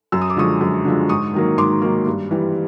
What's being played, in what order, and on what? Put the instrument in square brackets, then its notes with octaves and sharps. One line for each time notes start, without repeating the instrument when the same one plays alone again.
[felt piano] F#2 E6
D#6
D6
D3 F3 G#3 C#6 D#6
F#2
D3 F3 G#3
G#2 C#6 D#6
D#3 F#3 A#3
G#2 C6 D6
D#3 F#3 A#3
G2
E3 G3